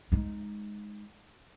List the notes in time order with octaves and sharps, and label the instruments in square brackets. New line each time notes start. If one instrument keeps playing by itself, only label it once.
[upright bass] G#3 D#4